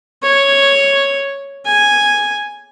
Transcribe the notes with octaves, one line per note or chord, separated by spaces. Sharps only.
C#5
G#5